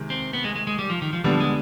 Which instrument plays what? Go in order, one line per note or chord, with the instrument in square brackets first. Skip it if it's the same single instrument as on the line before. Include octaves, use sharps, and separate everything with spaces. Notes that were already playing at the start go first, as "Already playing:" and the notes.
Already playing: [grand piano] C3 D#3 G#3
[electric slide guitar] C4
B3
G#3
G#3
G#3
G3
F3
D#3
F3
[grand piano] D3 G3 B3 D4 [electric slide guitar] F3
[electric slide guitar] G#3